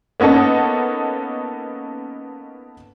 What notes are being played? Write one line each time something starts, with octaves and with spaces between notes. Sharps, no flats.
A#3 B3 C#4 D#4 A4